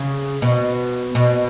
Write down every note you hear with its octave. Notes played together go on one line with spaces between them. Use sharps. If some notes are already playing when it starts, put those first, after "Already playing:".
Already playing: C#3
B2
B2